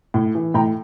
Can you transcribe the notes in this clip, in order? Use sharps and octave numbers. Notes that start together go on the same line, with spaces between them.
A2
E3
A2 G5 A#5